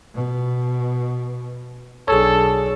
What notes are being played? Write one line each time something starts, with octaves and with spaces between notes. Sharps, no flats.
B2
B1 D4 G#4 A4 C#5